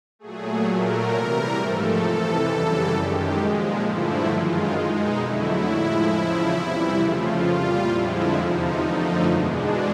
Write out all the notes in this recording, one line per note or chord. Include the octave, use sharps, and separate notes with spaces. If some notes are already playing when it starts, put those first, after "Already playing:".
A#2 F#3 A3 G#4
A#2 F#3 A3 A#4
C3 E3 G3 A#4
G#2 F3 A3 A4
F2 C3 E3
F#2 C#3 E3 G3
F#2 D#3 G#3 G4
A#2 F3 G#3
G2 D3 F3 A3 E4
F#2 D#3 G#3 F4
B2 G#3 D#4
F2 D3 F#3 A3 E4
A2 F3 G#3
E2 C#3 F3
C3 E3 G3
F2 C#3 F3 A3 F4
A#2 G3 F4
F2 D3 F3 G#3 E4
E2 C3 F3 D#4
F#2 D3 F3 A3 D#4
E2 B2 G#3 D4